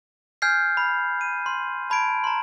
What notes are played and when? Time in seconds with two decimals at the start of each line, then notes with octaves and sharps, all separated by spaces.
0.42 G#5 F6 G6 G#6 C7
0.77 B5
1.21 D#7
1.46 C6
1.90 A5 B5 G#6 D7
2.24 A#5 C6